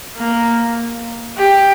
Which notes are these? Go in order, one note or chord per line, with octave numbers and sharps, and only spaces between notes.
A#3
G4